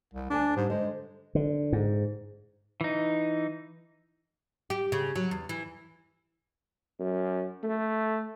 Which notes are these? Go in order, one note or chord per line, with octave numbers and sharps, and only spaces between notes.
C2
D2 D4 G#5
G#2 G3
D3 G#3 C5
D3
G#2
E3 D#4
G4
C#3
F#3
E2
E3
F#2
A3